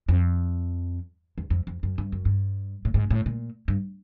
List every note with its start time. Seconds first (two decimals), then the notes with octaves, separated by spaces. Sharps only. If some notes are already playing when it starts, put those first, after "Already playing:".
0.08 F2
1.38 E2
1.50 F2
1.67 F2
1.83 F#2
1.98 G2
2.12 F#2
2.25 G2
2.85 A2
2.94 G#2
3.10 A2
3.26 A#2
3.68 G2